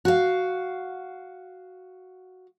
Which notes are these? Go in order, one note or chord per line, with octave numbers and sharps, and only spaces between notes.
F#4 F5